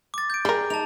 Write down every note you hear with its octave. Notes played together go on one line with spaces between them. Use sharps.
D6 A6
G6 D7
G3 G#4 A#4
D#4 A5 F7